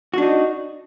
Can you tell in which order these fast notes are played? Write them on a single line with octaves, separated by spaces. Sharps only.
F#4 D4 D#4